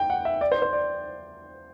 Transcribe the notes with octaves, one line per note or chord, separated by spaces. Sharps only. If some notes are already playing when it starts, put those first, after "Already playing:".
Already playing: G5
F#5
E5
D5
C5
C5
D5